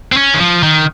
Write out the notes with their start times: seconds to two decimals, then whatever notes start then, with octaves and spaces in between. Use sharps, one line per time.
0.12 C4
0.17 C#4
0.34 D#3
0.40 F3
0.63 D#3